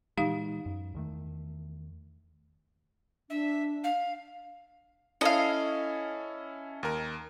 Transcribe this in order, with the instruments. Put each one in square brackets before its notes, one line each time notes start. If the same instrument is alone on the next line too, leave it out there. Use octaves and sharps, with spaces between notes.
[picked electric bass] A#2 E3 G#3 [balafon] D#4 G4 F5
[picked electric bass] F#2
E2 D#3 A3
[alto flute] D4 [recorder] E5
[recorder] F5
[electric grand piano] C#4 E4 A4 [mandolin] D#5 F5
[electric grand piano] D#2 A#4